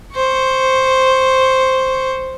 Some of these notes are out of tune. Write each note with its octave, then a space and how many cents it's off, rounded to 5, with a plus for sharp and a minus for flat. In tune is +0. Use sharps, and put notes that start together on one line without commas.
C5 +0 C#6 +0